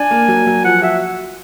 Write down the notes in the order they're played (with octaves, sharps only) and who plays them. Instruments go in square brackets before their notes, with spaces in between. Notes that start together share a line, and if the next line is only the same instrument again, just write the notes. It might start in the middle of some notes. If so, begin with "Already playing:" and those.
Already playing: [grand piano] D4 [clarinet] G#5
[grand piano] A#3
F#3
F#3
[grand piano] F3 [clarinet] F#5
[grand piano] F#4 [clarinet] E5